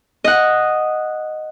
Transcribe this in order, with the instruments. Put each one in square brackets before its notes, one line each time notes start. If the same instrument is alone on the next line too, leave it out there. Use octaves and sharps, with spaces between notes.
[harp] D#5 F#5